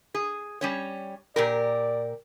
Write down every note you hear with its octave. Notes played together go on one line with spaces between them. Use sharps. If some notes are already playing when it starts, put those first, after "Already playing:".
G#4
G3 C#4 C#5
A#2 G4 A#4 D5